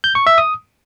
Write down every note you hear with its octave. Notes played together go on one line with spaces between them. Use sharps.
G6
C#6
E5
D#6